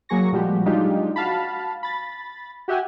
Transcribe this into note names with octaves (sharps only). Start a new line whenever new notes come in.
F#3 A#3 G#4 C#6 A#6
A#2 F3 G3 G#3 F#4 G4
F#3 G#3 D4 D#4 F4 G4
F#4 F5 A5 B5
B5 A6
F#4 G4 E5 F#5 G#5